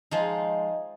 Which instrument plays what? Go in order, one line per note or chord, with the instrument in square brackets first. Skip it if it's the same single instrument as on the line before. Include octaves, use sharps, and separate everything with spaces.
[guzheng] F3 G#3 D#4